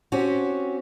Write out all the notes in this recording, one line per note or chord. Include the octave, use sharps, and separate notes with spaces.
C4 C#4 F#4 G4